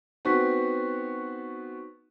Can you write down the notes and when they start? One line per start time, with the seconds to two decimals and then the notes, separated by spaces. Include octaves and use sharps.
0.25 B3 C4 D#4 F#4 C#6 B6